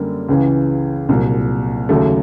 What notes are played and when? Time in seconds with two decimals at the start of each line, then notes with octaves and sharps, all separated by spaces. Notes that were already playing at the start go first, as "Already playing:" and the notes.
Already playing: F#2 D3 G3 A#3
0.29 C#2 C#3 E3
1.09 C2 A#2 F#3
1.89 D#2 C#3 F#3 A3